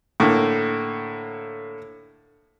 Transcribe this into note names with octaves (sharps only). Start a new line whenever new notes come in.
A2 D3 A#3